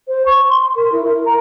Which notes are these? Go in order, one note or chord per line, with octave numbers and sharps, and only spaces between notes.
C5
C#6
C6
A#4
E4
A#4
A#5